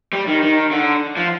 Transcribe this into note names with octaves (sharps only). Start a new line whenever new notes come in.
G3
D#3
D#3
D3
F3